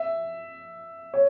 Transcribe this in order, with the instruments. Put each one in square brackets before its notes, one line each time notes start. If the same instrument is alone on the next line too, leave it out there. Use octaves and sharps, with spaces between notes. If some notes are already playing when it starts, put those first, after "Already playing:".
Already playing: [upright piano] E5
C#5